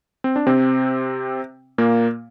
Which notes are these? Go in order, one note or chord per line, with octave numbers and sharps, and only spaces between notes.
C4
D4
C3 C4
A#2 A#3